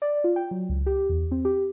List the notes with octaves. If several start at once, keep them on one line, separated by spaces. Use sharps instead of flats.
D5
F4
G5
F#3
C#2
G4
E2
C4
G4